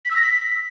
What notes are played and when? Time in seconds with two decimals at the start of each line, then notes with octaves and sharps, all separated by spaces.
0.05 B6
0.11 E6
0.16 A#6
0.22 B6